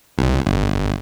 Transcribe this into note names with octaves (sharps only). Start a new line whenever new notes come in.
C2
G1